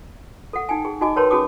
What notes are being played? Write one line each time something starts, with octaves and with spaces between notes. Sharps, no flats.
A4 F#5
D#4 G5 G#5
G#4
D#4 F#4 D#5 G#5 D6
A#4 B4 C#5 G5 A5 C6
C#4 F#4 G#4 A5 D6 D#6